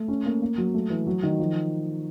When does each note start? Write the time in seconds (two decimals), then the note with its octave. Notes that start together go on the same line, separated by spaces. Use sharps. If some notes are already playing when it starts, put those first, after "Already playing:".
Already playing: A3
0.08 C#4
0.26 A#3
0.42 A#3
0.58 F#3
0.74 A3
0.90 E3
1.07 F#3
1.23 D#3
1.39 F3